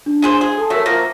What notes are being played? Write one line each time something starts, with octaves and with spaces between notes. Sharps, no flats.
D4
G#3 G#4 C5
G#4
A4 A5
F#3 A3 A#4 E5
F3 A#3 A#6